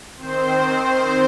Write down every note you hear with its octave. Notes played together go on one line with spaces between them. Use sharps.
D#3 C4 C5